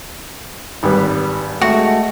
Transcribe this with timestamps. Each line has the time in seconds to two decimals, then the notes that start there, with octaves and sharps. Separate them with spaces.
0.83 G#1 G3 B4
1.61 G#3 A3 F#4